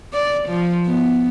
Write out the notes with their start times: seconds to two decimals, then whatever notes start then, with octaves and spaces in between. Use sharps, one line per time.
0.13 D5
0.48 F3
0.86 B3